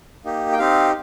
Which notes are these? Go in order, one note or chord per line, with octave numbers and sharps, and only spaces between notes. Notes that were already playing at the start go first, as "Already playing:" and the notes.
A#3 D#4 G4
G5
C4 D#4 G4 F5